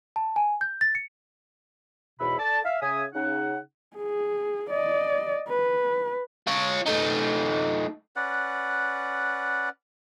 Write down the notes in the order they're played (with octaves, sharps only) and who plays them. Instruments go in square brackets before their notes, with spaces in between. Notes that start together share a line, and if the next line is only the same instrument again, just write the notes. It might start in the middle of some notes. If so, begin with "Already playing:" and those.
[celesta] A5
G#5
G6
A6
C#7
[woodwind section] E2 G#2 B2 C#5 E5 B5
A4 D5 A5
E5 F5
C#3 E5 G#5 D#6
C#3 D#4 F#5
[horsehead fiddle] G#4
D5 D#5
B4
[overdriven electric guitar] F4 C#5
A3 D#4
[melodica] C#4 B4 D5 F#5